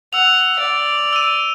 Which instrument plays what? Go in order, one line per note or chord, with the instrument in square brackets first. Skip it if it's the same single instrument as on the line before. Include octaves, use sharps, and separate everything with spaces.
[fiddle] F#5 [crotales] E6 F7
[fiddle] D5
[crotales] E6 D#7